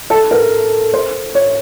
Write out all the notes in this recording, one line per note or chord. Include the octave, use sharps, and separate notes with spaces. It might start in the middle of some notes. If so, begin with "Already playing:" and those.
A4
A#4
C5
C#5